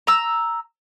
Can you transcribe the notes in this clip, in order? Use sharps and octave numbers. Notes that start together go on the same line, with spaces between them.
A#5 E6